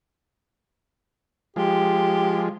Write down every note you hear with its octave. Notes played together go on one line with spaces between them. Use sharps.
F3 G#3 G4